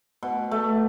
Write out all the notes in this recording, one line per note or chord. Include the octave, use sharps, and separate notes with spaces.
B2
A3